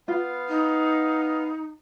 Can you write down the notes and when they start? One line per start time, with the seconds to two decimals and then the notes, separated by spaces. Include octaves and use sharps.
0.08 B3 F4 F5
0.49 D#4